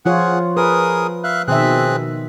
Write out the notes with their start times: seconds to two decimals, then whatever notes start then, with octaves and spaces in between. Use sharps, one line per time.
0.06 F3 F4 G#4 C#5 F#5
0.57 G#4 A#4 B4 D#6
1.24 E5 F5 F#6
1.48 B2 D#3 C4 G#4 E5 F#6